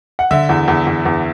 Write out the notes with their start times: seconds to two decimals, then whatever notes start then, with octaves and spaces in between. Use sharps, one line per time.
0.19 F#5
0.31 D3 E5
0.49 E2
0.68 E2
0.87 E2
1.06 E2